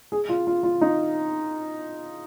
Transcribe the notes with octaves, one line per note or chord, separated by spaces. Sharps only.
G#4
F4
F4
F4
D#4